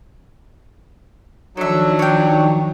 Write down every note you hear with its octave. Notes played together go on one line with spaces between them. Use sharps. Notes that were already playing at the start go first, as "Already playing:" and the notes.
D#3 F3 F#3 D4 D#4 A4 E5
C#5 G5